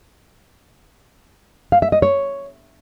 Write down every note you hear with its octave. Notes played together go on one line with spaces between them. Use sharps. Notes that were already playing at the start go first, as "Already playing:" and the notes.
F5
E5
D#5
C#5